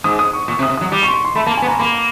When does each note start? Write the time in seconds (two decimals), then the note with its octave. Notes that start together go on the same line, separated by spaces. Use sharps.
0.04 G#2 D#6
0.19 D#6
0.33 C#6
0.48 A#2 C#6
0.59 C3
0.63 D#6
0.70 C3
0.77 D#6
0.81 F#3
0.92 G3 D6
1.03 C#6
1.08 C6
1.14 C#6
1.25 C6
1.35 A3 B5
1.46 A#3 A5
1.57 G#5
1.62 B3
1.68 A#3 A#5
1.79 A#3 B5